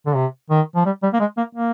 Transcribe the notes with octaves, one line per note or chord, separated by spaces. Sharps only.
D3
C3
D#3
F3
G3
G3
A#3
G#3
A#3
A#3